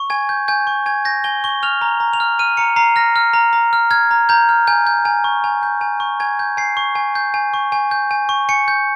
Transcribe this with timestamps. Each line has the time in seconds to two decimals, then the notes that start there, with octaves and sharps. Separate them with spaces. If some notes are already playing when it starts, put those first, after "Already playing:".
Already playing: C#6
0.10 G#5 G#6
0.29 G6
0.48 G#5 G6
0.67 C#6
0.86 G#5 G#6
1.05 G6 A#6
1.24 G#5 G7
1.44 C#6 G7
1.63 F6 F7
1.81 A#5
2.00 A#5
2.13 F7
2.20 F6
2.39 F6 D#7
2.57 A#5 C#7
2.76 A#5 C7
2.96 F6 A#6
3.16 F6
3.33 A#5
3.53 A#5
3.73 F6
3.91 F6 G#6
4.11 A#5
4.29 A#5 G6
4.49 F6
4.67 G#5 G6
4.87 G6
5.05 G#5
5.24 C#6
5.44 G#5
5.63 G6
5.81 G#5
6.00 C#6
6.20 G#5 G#6
6.39 G6
6.57 G#5 C7
6.77 C#6
6.95 G#5
7.15 G6
7.34 G#5
7.54 C#6
7.72 G#5
7.91 G6
8.11 G#5
8.29 C#6
8.49 G#5 C#7
8.68 G6